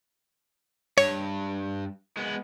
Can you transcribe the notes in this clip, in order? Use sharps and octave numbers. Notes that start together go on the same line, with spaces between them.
G2 C#5
G#3 B3